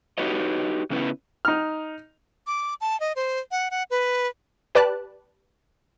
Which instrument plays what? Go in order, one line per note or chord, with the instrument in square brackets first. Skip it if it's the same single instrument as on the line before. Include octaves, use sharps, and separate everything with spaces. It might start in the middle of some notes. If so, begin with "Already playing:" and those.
[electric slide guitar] D#4 F#4 G4 B4 C#5 D#5
C#3 B3 C#4 E4 B4
[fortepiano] D#4 F6
[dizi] D6
A5
D#5
C5
F#5
F#5
B4
[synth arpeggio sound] G4 B4 D5 A5 F#6